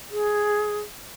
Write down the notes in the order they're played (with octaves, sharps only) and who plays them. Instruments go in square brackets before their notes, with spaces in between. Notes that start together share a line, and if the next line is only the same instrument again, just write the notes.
[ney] G#4